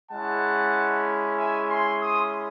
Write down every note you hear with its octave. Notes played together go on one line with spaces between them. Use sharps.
G#3 C#4 E4 F#5 A5
E5 G#5
G#5 C6
C6 D#6